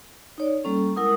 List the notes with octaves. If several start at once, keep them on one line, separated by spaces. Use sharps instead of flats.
D#4 C#5 D5
G3 A#3 C#4 A4
G#3 E4 A#4 F#5 D#6